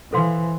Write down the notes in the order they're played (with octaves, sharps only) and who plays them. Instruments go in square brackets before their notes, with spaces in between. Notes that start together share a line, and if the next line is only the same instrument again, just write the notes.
[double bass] E3 [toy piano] A4 C5 F5 C6